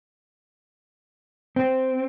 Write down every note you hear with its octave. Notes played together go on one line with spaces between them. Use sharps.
C4